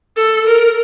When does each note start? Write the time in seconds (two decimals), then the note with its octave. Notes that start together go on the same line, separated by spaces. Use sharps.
0.17 A4
0.46 A#4